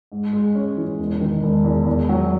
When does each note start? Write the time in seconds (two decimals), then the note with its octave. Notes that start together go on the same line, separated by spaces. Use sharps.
0.12 G#2
0.33 G#3
0.55 C#4
0.77 E3
0.99 E1
1.21 D#3
1.43 E1
1.64 E2
1.86 E2
2.09 F#3